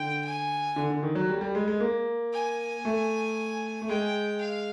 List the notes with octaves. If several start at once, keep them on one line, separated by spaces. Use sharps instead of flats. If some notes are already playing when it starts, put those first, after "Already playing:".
Already playing: D3 G5
G#5
D3
D3
D#3
F#3
G3
G3
G#3
G#3
A#3
G#5
A3
A3
G#3 G5
F5